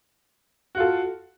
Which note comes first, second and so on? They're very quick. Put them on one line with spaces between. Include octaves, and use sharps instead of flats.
F#4 F4 A4